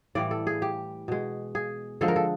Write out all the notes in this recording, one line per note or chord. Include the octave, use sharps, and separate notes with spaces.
A2 E3 G3 D5
A4
G#4
G4
B2 G#3
G#4
D3 F3 G#3 A4
A#4
A4